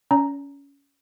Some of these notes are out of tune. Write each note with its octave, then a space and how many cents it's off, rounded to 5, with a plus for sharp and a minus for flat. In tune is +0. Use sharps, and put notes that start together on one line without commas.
C#4 +20 D5 -40 A#5 +0